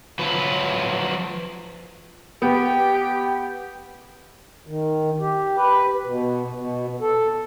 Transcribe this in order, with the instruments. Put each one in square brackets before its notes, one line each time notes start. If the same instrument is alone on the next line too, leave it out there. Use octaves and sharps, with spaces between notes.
[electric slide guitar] F3 F#3 B4
[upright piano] B3 [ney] G4 [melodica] G5
[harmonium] D#3
G4
B4
B2
B2
A4